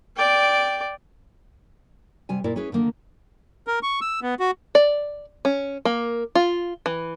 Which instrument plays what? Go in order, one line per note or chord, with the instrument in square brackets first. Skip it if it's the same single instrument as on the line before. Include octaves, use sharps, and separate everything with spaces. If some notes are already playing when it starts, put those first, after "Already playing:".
[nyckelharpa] D5 G5
[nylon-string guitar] C3 G3 G#5
A#2 E4 A#4 D5
C#4 E4 G#4 B4
D3 D#3 A#3
[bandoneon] A#4
C#6
E6
B3
F#4
[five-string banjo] D5
C#4
A#3
F4
E3